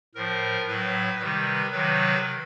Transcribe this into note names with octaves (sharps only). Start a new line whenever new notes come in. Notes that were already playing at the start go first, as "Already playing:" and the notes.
A2 F3 A#4
A2 F#3 B4
C3 D#3 G3 B4
C3 D#3 F#3 B4